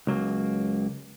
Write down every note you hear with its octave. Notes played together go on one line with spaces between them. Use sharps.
C#2 F#3 A#3